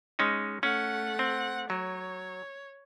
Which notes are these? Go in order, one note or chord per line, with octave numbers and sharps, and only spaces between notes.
G#3 C#4 D#4
A3 C#4 F#5
C4
F#3 C#5